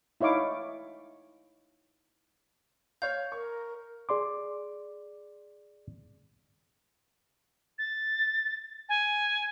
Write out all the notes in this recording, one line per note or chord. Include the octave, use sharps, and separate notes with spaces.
D#4 E4 C#5 F5 D6
C#5 F5 G6
A#4 C#6
G#4 D5 C6 D6
A6
G#5